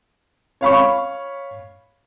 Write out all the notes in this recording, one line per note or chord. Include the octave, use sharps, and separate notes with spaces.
C#5 F5 B5 C#6